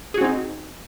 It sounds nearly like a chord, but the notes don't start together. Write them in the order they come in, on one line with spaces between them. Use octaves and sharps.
G#4 F#4 C4 D#4